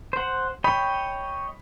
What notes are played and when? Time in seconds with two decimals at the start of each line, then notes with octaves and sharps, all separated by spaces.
0.13 C5 F#5
0.64 C#5 D#5 G5 B5